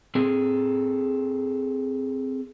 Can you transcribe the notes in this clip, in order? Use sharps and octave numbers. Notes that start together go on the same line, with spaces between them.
C4 G#4 A4